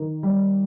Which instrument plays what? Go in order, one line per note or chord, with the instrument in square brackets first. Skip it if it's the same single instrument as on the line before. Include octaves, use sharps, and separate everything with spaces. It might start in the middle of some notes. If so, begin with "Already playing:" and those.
Already playing: [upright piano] D#3
G3